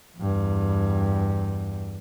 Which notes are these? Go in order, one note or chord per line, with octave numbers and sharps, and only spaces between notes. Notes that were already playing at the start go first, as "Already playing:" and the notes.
E2 G2